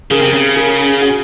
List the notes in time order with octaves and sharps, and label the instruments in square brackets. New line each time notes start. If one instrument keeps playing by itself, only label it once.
[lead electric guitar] C#3 [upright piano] G#4 A#4
[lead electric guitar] C3
C#3
[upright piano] G#4 A#4
F#4 G#4